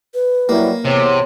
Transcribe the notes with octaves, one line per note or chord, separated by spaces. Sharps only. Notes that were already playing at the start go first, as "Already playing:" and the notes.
B4
F#3 G3 A#3 E4
E2 C3 C#5